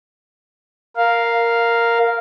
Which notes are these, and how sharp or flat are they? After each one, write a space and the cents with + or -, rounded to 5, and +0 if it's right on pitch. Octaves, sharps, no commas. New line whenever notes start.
A#4 +0 F5 +0